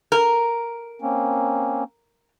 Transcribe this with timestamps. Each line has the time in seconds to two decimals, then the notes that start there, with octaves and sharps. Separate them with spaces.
0.12 A#4
1.02 A#3 C4 C#4